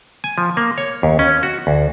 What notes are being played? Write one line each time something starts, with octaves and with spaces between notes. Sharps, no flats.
G#5
F3
A#3
C#5
D#2
C#4
F#4
D2